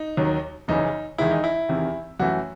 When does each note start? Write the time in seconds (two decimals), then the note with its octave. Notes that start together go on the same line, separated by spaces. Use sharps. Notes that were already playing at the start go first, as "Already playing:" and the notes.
Already playing: D#4
0.17 D#2 D#3 F#3
0.68 F#1 F#2 C#3 E3 D#4
1.18 E2 D#3 G#3 E4
1.31 D#4
1.44 E4
1.69 E2 C3 D#3
2.19 F#2 E3 A3 F#4